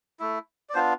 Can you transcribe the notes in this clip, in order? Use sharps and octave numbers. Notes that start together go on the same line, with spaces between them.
A3 E4
D5
B3 D4 F4 C5